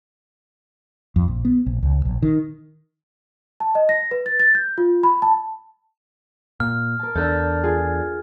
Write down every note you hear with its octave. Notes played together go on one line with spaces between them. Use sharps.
F2
A#1
B3
A#1
C#2
A#1
D#3
A5
D#5
A#6
B4
A6
A6
G6
F4
B5
A5
A#2 F6
A#4 A5
E2 D4 A4 E6 G6
F4 G#4